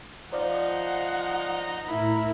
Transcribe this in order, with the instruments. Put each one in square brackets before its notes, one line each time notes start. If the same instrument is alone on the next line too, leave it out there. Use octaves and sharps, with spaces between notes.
[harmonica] F3 D#4 [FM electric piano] C5 D5 F5 [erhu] F#5
[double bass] A2 E4 [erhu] A#4 [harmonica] B5